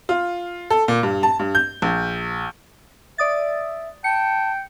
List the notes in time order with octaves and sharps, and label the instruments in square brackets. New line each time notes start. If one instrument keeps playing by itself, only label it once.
[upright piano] F4
A4
A#2
G2
A5
G2
G6
A#1
[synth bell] D5 D#6 A6 [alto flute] E5
[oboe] G5 [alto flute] A5 [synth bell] C#7